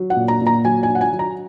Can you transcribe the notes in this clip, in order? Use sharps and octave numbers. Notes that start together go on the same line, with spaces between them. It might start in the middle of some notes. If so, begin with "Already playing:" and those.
Already playing: F#3
F#5
A#2
A#5
A#2
A#5
F#3 G#5
G#5
F#3
F#5
G#5
F#3
A#5